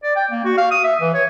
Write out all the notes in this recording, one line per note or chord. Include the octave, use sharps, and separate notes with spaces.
D5
G5
A#3
F#4
F5
D#6
E5
E3
C#5